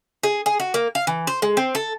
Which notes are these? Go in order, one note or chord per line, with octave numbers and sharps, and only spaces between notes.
G#4
G#4
F#4
A#3
F5
E3
C5
G#3
C4
A4